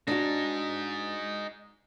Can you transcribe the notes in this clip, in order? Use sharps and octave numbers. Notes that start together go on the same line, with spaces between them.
D4 D#4 F#4 G#4